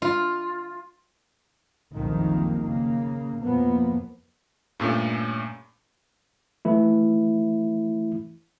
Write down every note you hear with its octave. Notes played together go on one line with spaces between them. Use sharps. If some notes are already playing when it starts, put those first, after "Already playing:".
F4
F#1 C2 F2 C3 D#3 A#3
C#3 A#3
F2 B2 F3 A#3 B3
G2 A#2 A3 C#4
E3 A3 E4